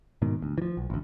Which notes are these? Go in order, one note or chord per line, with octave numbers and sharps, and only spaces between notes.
G#2 B2 D#3
D2
E3 F3
B1
A1 D2